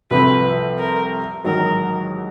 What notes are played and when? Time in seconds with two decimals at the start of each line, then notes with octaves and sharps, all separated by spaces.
0.10 C2 C3 F3 A3 C4 B4
0.78 A#4
1.44 A1 G#2 D#3 F#3 A#4